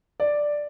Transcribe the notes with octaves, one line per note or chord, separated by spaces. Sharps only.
D5